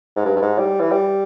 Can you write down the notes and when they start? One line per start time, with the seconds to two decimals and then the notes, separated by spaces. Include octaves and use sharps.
0.16 G#2
0.25 G2
0.36 G2
0.42 G#2
0.58 G3
0.80 E3
0.91 G3